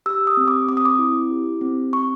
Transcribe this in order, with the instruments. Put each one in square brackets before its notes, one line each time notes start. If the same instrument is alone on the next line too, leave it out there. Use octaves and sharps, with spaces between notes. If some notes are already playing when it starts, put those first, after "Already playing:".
[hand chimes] G4 E6
D#6
C4
D6
C4 D6
D#6
D6
E4
G4
C4
C4 C#6